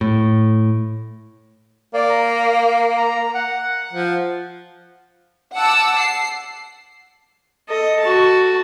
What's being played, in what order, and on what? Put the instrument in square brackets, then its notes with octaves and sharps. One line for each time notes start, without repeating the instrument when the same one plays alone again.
[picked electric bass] A2
[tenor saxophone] A#3 [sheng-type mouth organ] D5
[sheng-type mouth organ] A#5
A#5
F#5
[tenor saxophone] F3
[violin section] F#5 A5 D6 E6
C7
[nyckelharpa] A4 D#5
F#4 A5